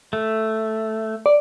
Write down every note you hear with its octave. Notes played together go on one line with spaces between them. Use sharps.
A3
D5